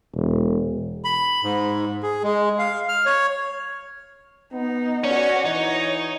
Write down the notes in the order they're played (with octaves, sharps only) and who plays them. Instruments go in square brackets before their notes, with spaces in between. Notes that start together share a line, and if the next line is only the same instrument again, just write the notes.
[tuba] E1
[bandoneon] B5
G#2
G#4
G#3
F5
F6
C#5
[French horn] B3 [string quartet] D#4
[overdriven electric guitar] C#4 [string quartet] F#4 C#5 [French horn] D5
[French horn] E3 [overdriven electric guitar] D#4 [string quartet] C#5